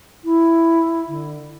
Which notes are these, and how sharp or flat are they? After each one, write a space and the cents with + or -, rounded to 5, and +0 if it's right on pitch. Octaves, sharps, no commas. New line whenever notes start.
E4 +5
D3 +30